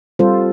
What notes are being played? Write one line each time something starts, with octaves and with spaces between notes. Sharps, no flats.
G3 C4 F4 A4 C5